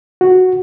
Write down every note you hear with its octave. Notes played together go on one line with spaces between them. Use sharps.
F#4